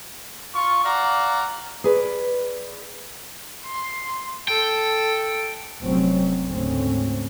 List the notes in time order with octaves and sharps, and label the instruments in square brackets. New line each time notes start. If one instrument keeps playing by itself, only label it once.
[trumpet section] F4 C#6
F#4 D5 F5 A#5 D6
[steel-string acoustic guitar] G#4 B4 D5
[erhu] C6
[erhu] A4 [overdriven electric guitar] G5
[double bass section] F1 F2 B2 F#3 C4 C#4
D2 G#2 C#3 A3 C4 C#4